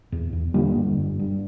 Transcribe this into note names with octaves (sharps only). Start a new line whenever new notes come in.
E2
E2
D3 G3 A#3
G2
G1
G2